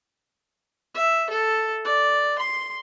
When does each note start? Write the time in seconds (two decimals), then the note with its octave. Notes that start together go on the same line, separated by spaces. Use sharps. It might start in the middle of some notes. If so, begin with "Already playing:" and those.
0.94 E5
1.30 A4
1.85 D5
2.38 C6